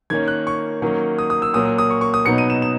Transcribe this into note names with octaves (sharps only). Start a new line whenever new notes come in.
D#3 A#3 C#4 G#6
F#6
C#6
D#3 F#3 A#3 C#4
D#6
D#6
E6
A#2 F#3 A#3 D#6
D#6
D#6
C#6
C#6
D#6
B2 F#3 B3 D#4 C#7
D#7
E7
E7